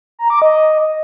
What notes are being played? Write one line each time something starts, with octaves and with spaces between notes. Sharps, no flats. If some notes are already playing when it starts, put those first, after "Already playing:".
A#5
D6
D#5